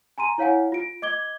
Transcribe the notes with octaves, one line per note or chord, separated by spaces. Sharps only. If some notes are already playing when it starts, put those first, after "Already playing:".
G#5 A#5 C6 D#7
E4 C#5 F5 F#5 G#5
F4 D7
D#5 D6 G#6 G7